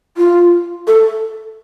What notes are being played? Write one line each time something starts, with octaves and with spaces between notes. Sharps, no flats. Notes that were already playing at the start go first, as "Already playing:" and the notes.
F4
A4